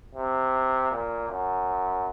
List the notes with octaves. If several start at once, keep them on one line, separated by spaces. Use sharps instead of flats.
C3
A#2
F#2